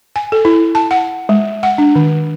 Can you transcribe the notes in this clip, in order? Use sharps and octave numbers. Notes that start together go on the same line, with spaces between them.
G#5
A4
E4
A5
F#5
G#3
F#5
D4
D#3